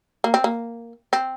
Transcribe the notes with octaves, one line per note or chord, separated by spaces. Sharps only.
A#3
C4
A#3
C4